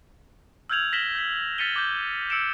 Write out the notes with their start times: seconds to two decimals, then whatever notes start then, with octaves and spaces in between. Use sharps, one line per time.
0.70 E6 F6 G6 G#6 F7 F#7
0.92 F6 A#6 B6 E7 F#7 G7
1.15 G6 B6
1.58 F6 A6 B6 C#7 D#7 G7
1.76 D6 G6
2.30 E6 C#7 D7 E7